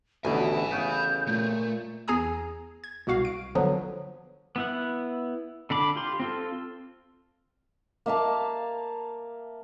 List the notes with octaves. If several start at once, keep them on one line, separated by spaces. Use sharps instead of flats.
A1 D2 B2 E5 G#5 B5
A1 C#3 B3 G6
A#2 A3
E2 G#4 G#5 A#5 D#6
G#6
C2 B2 F#4 F5
D7
D3 F3 F#3 B3
B3 E4 F#5
D3 D4 B5 D6
F4 G4 C6
C4 F4 A4
A#3 E5 F5 A5